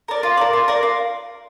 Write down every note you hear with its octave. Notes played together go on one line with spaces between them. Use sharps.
A#4 D5
F4
A#4 D5
F4
A#4 D5
F4